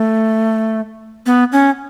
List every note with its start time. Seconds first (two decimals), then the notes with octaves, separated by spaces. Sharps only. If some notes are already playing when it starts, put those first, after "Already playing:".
Already playing: A3
1.26 B3
1.52 C#4